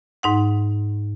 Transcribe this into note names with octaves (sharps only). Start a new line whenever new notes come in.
G#2 D#4 F#5